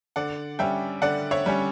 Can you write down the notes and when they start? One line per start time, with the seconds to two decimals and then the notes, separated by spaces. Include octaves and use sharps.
0.16 D3 D5 F#5
0.59 G3 C#4 E5 G5
1.02 D3 D5 F#5
1.31 C#5 E5
1.46 G3 C#4